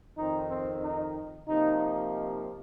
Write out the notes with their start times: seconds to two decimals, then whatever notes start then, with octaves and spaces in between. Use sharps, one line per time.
0.17 F2 D#3 C4 D#4
0.50 C4
0.83 D#4
1.47 C3 F3 A#3 D#4
1.80 D#4